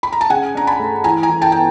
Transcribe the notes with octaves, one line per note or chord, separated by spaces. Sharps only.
B5
A#5
A5
C#3 F#5 G#5
D4 A#5
A5 B5
A3
E3 G#5 A#5
G#5 A#5
E3
G5 A5
B3 G5